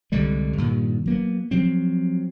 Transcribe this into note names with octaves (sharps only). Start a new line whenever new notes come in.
C2 D3 G3 G#3
G2 A#2 D#3
F#3 A#3 B3
F3 F#3 C4